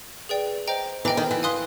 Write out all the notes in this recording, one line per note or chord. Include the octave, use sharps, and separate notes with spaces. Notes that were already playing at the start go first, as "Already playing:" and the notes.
G#4 B4 D5 G5
C5 D#5 G5 A#5
E3 D#5 G5 A#5 D6
D#3
E3
F5 G#5 C6 D#6 F#6